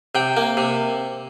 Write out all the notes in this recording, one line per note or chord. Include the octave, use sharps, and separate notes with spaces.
C3 G5
A#3
C3